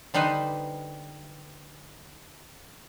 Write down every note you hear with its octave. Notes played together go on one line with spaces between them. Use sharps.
D3 G3 D#4 B4 C5